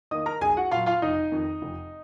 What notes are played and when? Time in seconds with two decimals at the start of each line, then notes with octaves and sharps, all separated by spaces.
0.11 D#3 A#3 D#5 D#6
0.26 A#4 A#5
0.41 B1 G#4 G#5
0.57 F#4 F#5
0.71 A#2 F#3 F4 F5
0.86 F4 F5
1.02 F1 D#4 D#5
1.32 F2 D#3
1.62 F1